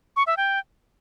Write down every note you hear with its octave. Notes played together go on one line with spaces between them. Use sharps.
C#6
E5
G5